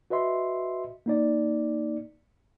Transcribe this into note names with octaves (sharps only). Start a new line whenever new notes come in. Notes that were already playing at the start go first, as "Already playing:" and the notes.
F#4 B4 D#5 E5 C6
A#3 D#4 D5